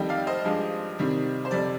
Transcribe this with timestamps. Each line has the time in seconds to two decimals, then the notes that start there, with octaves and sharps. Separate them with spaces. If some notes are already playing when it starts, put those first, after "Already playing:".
Already playing: F2 D#3 G3 D#5 G5
0.09 D5 F5
0.27 C5 D#5
0.45 G2 F3 G#3
0.99 C3 D#3 G3
1.45 C5
1.51 F2 C3 G3 D5